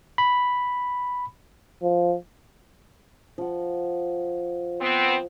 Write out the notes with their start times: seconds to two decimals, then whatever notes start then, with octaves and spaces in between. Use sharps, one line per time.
0.18 B5
1.82 F3
3.38 F3 F#5
4.81 B3 C4